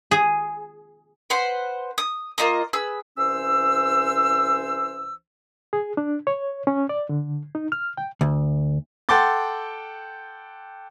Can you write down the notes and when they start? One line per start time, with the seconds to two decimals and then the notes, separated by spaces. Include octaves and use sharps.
0.11 G#4
1.30 B4 C5 F#5 C6
1.98 D#6
2.38 A#3 F4 D#5 D#6
2.73 G#4 B4 E6
3.18 C2 E3 C#4 C5 E6
5.73 G#4
5.97 D4
6.27 C#5
6.67 C#4
6.89 D5
7.09 D3
7.55 D#4
7.72 F6
7.97 G5
8.21 D2
9.09 A4 F#5 G5 C6 D6 A6